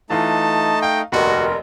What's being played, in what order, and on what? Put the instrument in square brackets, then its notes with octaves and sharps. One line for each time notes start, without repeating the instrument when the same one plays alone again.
[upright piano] E3 F4 [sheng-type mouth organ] A3 D#4 D#5 [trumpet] A5
[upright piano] F5 [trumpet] G5
[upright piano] F1 A#1 D#2 [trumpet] F#4 [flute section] A#4 D#5 C6